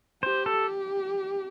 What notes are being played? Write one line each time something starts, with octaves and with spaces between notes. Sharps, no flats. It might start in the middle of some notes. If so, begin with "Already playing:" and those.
G4 C5
A4